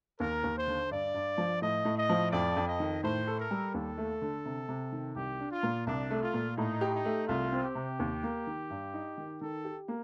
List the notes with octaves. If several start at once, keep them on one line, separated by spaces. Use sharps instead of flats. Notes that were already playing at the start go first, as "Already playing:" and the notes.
D#2 A#4
D#2
C5
D3
G2 D5
G2
F3
A2 D#5
A2
D#5
F3
F2 D5
F2
D#5
D#3
A2 C5
A4
A#4
G3
D#2 A4
A3
D3
C3
C3
D#3
C2 G4
D4
F4
A#2
C2 D4
A3
F4
A#2
A2 D#4
G4
D#4
A3
C2 F4
C4
G4
C3
D#2
A#3
D#3
G2
D#4
D#3
D#3 A4
G4
A#3